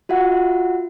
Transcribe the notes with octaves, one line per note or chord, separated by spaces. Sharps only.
F4 F#4 E5 F#5